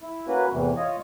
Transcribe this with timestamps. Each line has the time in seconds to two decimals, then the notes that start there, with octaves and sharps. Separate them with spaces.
0.01 E4
0.27 A#3 C#4 F#4 B4
0.52 E2 A2 C3 E3
0.77 F4 C#5 D#5